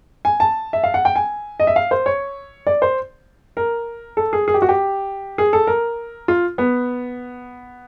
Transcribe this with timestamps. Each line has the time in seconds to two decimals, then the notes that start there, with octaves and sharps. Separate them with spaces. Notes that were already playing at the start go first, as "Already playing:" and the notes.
0.25 G#5
0.40 A5
0.73 E5
0.84 F5
0.94 F#5
1.05 G5
1.16 G#5
1.60 D#5
1.67 E5
1.76 F5
1.91 C5
2.06 C#5
2.67 D5
2.82 C5
3.57 A#4
4.17 A4
4.33 G#4
4.48 G#4
4.54 G4
4.62 F#4
4.69 G4
5.38 G#4
5.53 A4
5.67 A#4
6.28 F4
6.58 B3